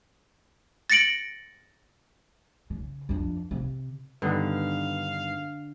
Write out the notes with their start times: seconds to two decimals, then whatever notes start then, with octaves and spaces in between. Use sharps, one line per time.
0.90 A6 A#6 C#7 D7 F#7
2.70 C#3
3.09 F2 D4
3.51 C3
4.22 G2 D3 D#3 B3 F5